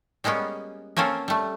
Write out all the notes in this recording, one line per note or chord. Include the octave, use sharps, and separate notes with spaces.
G3 G#3 A#3 B3 C#4
A#3 C4 C#4 A4 A#4
G3 A3